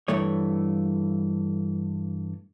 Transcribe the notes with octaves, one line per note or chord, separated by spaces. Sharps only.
G2 E3 A3 C#5